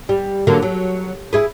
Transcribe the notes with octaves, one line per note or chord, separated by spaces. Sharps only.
G3
D3 F#3 A#3
F#3
E4 G#4 B4